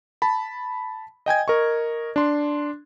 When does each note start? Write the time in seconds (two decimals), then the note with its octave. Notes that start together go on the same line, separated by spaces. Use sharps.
0.22 A5 B5
1.26 D#5 G5 G#5 G#6
1.48 A#4 D#5 C#6
2.16 D4 C6